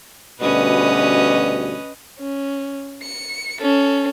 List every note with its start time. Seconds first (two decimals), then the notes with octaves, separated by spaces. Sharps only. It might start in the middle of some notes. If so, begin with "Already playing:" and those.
0.41 D2 B2 G3 C#4 B4 D#5
2.19 C#4
3.03 C#7
3.61 C#4 A4